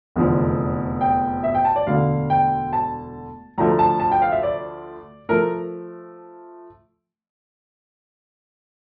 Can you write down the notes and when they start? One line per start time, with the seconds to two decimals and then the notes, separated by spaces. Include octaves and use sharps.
0.16 F1 E2 D3 F3
1.01 G5
1.44 E5
1.55 G5
1.65 A5
1.76 D5
1.87 E1 D2 D3 F5
2.30 G5
2.73 A5
3.58 D2 D3 F3 A3 A#5
3.79 A5
4.00 A5
4.12 G5
4.22 F5
4.32 E5
4.43 D5
5.29 F3 A3 A#4